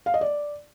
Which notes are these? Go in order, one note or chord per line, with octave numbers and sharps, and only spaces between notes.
F5
D#5
D5